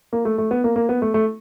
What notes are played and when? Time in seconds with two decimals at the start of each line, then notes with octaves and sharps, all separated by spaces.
0.13 A#3
0.25 A3
0.38 A3
0.51 B3
0.64 A#3
0.76 A#3
0.89 B3
1.02 A3
1.14 A3